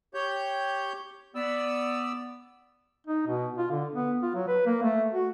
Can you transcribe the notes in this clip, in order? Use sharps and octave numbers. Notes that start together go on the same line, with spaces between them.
G4 C#5 G6
B3 D5 E6
D#4
B2
F4
D3
B3
F4
F#3
B4
A#3
A3
F#4